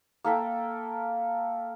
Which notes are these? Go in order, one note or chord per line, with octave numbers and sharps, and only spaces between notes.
A#3 A4 E5 G5